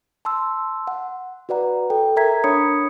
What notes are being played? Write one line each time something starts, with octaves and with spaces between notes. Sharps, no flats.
A5 C6 E6
F#5
F#4 B4 D5 F#5 A#5
A4 G5
A#4 E5 A#5 G#6 B6
D4 C#5 B5 D#6 G#6 C#7